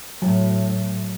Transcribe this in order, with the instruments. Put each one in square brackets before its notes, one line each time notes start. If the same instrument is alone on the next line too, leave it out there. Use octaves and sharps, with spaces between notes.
[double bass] A2 [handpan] F#3